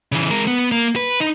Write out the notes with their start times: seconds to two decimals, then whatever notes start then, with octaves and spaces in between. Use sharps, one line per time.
0.12 C#3 E3
0.30 G#3 A#4
0.47 B3
0.72 A#3
0.96 B4
1.20 D#4